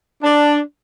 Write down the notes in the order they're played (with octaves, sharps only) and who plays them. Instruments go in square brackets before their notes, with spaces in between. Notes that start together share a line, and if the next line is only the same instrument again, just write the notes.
[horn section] D4